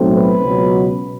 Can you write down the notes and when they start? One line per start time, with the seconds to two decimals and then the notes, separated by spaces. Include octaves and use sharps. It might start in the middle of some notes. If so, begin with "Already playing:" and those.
Already playing: B1 A2 F#3 A3 C4
0.14 B4
0.43 C#2 B2 F#3